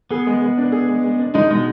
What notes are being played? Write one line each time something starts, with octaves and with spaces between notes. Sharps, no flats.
B3 G#4
G#3
G#3
D4
G#4
G#3
G#3
D4
G#3 D#4
B2 G#3